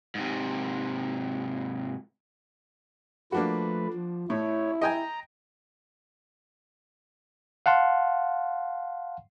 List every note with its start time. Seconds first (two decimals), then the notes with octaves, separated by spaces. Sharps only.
0.15 G#2 C3
3.32 F3 A3 A#3 D4 F#4 B4
3.93 F3
4.30 A2 E4 C#5
4.81 D#5 G5 G#5 A#5
7.66 F5 F#5 A5 C6